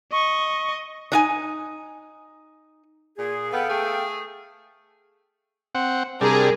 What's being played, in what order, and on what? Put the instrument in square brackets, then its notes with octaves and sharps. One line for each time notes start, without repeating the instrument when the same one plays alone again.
[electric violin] D#5 [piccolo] C#6
[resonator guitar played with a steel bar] D4 D#4 G#5
[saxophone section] A#2 [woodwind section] G#4
[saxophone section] B3 [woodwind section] A4 F5 G5
[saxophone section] A3 G#4
[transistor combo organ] C4 F#5
[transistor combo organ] C3 G3 D4 [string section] G#4 A#4